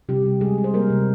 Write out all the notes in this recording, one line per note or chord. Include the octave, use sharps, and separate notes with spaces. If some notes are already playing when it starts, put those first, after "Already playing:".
C3 G3 G4
C3
G3 G#3 G#4
G3
C5
G3 A#3 A#4
C3